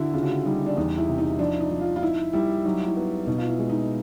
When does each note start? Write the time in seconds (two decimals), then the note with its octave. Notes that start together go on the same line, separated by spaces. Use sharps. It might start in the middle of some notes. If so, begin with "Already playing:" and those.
Already playing: D3 E4 F#4
0.14 C#3 F4
0.23 F#4
0.31 F4
0.46 G3 D#4
0.66 D4
0.77 E2 D#4
0.98 E4
1.08 C3
1.18 D#4
1.39 F3 D4
1.60 D#4
1.70 F3
1.81 F4
1.96 F4
2.02 D#4 E4
2.33 G3 E4
2.65 F#3 D#4
2.86 E4
2.96 B3
3.27 B2 D#4
3.38 F4
3.48 E4
3.59 G#3
3.69 D#4